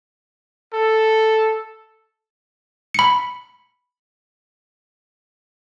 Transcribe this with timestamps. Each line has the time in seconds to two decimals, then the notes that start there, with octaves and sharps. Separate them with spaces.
0.73 A4
2.94 B5 C#7